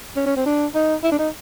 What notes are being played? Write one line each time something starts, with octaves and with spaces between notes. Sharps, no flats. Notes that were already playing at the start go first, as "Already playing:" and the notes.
C#4
C#4
C4
D4
D#4
E4
D4
D#4